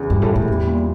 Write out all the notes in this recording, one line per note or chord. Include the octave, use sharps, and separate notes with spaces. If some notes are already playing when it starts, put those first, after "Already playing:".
Already playing: E2 C#3
G2 G3
A2
E3
A2
E2 G3
A#2